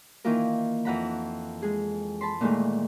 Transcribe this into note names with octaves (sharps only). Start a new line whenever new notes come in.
D#3 E3 A#3 F4 A#4
F2 E3 F#5 A#5 B5
G#3 G#4
A5 B5 C6
A#2 D#3 E3 G#3 A3